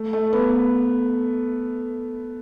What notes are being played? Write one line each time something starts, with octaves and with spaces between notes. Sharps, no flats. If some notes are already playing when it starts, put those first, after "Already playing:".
Already playing: A3
A3
B3